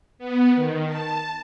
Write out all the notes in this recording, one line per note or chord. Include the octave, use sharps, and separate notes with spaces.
B3
D#3
A5